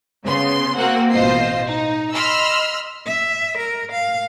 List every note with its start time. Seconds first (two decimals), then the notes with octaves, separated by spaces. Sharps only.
0.25 C#3 B3 C6
0.77 A#3 C4 F#4 F#5
1.12 A1 B2 F4 C5 D#5 C7
1.66 D#4
2.13 D#5 B5 C6 E6 F6
3.06 E5
3.58 A#4
3.92 F5